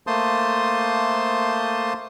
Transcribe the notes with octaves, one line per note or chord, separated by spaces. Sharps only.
A3 A#3 C5 A5 C6 D#6